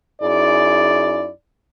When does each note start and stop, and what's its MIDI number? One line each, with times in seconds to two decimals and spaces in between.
0.21 1.29 42
0.21 1.29 63
0.21 1.29 64
0.21 1.29 68
0.21 1.29 74